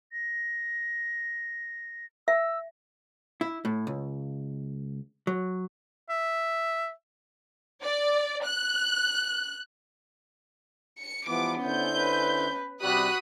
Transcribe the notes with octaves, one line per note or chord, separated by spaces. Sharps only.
A#6
E5 E6
E4
A2
C#2
F#3
E5
D5
F#6
C#7
E3 F3 G3 B3 D6
D3 C#4 E4 C5 G6
B4
C3 G3 F#4 B5 D#6 F#6